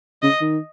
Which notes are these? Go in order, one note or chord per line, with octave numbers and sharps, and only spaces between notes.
C#3 D#5
D#3